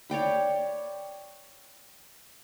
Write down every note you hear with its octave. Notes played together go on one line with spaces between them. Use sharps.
C#5 D5 G5 B5